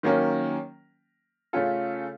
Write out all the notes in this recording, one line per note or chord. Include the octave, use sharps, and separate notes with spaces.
D#3 F#3 A#3 C#4
C#3 A3 C#4 F4 A4